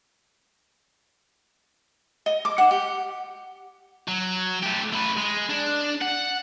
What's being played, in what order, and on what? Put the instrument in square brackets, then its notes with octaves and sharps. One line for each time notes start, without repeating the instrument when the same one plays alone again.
[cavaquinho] D#5
D6
F#5
G4
[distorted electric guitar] F#3
A3 G4
A3 B4
G#3
D4
F#5